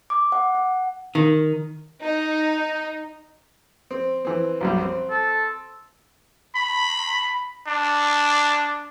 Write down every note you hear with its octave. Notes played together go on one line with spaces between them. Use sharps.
D6
F#5
F#5
D#3
D#4
C4
E3 C4
B1 F#2 G3
C4
A4
B5
D4